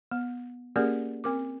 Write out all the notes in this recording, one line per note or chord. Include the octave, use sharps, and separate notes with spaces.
B3
A#3 C#4 G4 G#4 A#4 D5
C4 A#4 D6